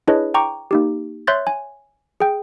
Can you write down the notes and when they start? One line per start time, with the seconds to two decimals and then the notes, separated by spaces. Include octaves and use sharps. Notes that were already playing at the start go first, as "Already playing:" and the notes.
0.07 D4 E4 G#4 B4 C#5 D#5
0.34 G5 A#5 C#6 D6
0.71 A#3 D#4 G4
1.27 C#5 E5 C6 F#6 G6 A6
1.47 G#5
2.20 G#4 G5